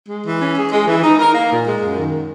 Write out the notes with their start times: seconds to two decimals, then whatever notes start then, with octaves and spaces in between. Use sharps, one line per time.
0.09 G#3
0.26 E3
0.41 C#4
0.56 G#4
0.72 G#3
0.88 E3
1.04 D#4
1.19 A#4
1.35 A#3
1.51 A#2
1.66 G#3
1.82 F#2
1.97 D#3